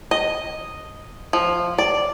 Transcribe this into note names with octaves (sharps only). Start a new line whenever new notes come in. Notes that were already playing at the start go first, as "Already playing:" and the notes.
D#5
F3
D5